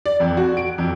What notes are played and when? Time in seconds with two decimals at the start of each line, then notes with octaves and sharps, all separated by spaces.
0.06 D5
0.20 F2
0.37 F#4
0.57 D7
0.78 F2